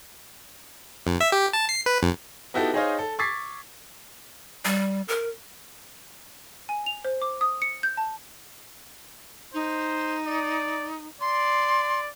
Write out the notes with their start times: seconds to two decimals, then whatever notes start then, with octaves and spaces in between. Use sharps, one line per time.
1.07 F2
1.21 E5
1.32 G4
1.53 A5
1.69 C7
1.86 B4
2.03 F2
2.54 B3 D#4 E4 F#4 G4 A4
2.74 D#4 G#4 C5 C#5 D#5 F5
2.99 A4
3.19 C#6 D6 G#6 A6 B6 C7
4.65 G3
5.08 A#4
6.69 G#5
6.86 F7
7.05 C5
7.22 D6
7.41 D#6
7.62 C#7
7.83 G6
7.97 A5
9.54 D#4 C5
10.27 D5
11.21 D5 C6